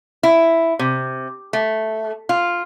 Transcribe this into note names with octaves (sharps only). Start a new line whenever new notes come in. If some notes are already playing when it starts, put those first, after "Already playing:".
E4
C3
A3
F4